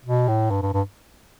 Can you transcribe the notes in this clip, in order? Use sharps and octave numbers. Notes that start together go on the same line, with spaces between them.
B2
A2
G2
G2
G2